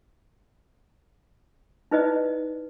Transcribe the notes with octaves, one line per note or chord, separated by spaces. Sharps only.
D#4 E4 B4 C5 D5 D#5